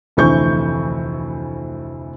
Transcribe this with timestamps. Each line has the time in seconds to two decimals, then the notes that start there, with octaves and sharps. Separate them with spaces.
0.17 F1 D2 E3 C4 C#6 G6